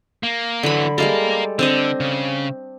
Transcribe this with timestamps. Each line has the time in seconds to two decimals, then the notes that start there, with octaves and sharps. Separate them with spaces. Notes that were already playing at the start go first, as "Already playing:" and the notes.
0.23 A#3
0.63 D3 E3 F#3 B5
0.98 G3 G#3 A4 A#4 F5
1.59 D3 C4 D4 D#5
2.00 C#3